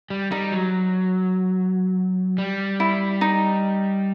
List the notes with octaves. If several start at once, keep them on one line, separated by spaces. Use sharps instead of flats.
G3
G3 D#4
F#3
G3
E4
D#4